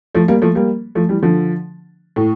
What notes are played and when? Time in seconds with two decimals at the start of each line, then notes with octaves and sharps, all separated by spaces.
0.15 F3 A3
0.28 G3 A#3
0.42 F3 A3
0.55 G3 A#3
0.95 F3 A3
1.09 E3 G3
1.22 D3 F3
2.16 A2